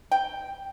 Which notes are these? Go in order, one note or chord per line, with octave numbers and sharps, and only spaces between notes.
G5